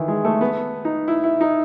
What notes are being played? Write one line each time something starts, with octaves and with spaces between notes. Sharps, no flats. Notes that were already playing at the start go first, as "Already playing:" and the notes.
Already playing: D#3 E3
G#3
A3
B3
D#4
E4
E4
D#4